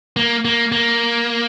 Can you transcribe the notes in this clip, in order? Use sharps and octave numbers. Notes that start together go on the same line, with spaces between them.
A#3
A#3
A#3